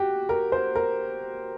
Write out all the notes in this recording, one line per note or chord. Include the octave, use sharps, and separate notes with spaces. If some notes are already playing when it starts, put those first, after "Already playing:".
Already playing: F#4 G4
A#4
C5
A#4